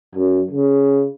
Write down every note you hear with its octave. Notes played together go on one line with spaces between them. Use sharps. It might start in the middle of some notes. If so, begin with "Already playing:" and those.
F#2
C#3